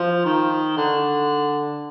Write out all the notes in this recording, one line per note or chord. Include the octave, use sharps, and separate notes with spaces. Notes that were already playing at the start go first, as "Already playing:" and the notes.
Already playing: F3
D#3
D3